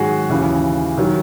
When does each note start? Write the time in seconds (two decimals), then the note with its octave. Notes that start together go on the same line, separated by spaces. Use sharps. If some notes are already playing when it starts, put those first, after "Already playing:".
Already playing: G#2 D#3 F#3 F#4 G#4
0.30 D#2 C#3 E3
0.98 D#3 F#3